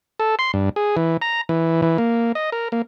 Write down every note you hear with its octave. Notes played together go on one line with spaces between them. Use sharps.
A4
C6
G2
G#4
E3
A#5
E3
E3
A#3
D#5
A#4
A#3